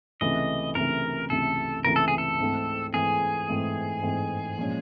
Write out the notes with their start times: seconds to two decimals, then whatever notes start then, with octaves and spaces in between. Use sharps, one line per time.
0.21 C#2 C3 E3 A3 D#5
0.75 C#2 C3 E3 A3 A#4
1.30 C#2 C3 E3 A3 A4
1.85 C#2 C3 E3 A3 A#4
1.96 A4
2.08 G#4
2.18 A4
2.39 G#2 E3 A3 C4
2.94 G#2 E3 A3 C4 G#4
3.48 G#2 E3 A3 C4
4.03 G#2 E3 A3 C4
4.58 A#2 F3 G#3 C#4